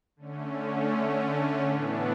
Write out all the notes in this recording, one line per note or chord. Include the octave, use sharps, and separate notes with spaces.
D3 A3 C#4
A2 E3 B3 D4